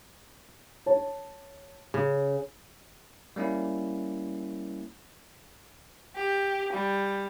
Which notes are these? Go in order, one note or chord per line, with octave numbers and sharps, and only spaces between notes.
C#5 A5
C#3
G3 A#3 C#4 E4
G4
G3